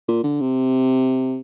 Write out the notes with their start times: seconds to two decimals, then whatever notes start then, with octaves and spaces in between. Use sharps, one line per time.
0.08 A#2
0.24 D3
0.40 C3